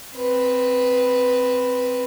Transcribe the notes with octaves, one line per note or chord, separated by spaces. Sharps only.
C4 B4